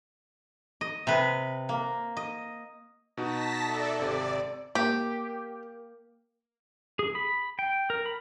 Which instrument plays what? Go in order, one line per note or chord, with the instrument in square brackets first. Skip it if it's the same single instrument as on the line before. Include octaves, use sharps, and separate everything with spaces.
[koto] D#5
C3 B4
A#3
D#5
[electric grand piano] B2 D#4 F#4 [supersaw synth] A5 A#6 B6
[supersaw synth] A4 D5 E5
[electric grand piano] G#1 C3 [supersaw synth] D5
[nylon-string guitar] A#3 [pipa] G4
[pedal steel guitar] G#4
B5
G5
A#4
B5